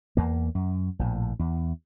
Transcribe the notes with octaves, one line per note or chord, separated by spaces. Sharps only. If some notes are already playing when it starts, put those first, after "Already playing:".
E2 A#3
F#2
A#1 A2
E2